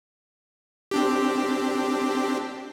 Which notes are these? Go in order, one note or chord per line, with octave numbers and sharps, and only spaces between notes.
C4 D4 G4